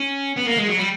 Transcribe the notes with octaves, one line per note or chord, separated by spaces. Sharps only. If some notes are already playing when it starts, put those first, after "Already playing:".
Already playing: C#4
B3
A#3
G#3
F#3
G3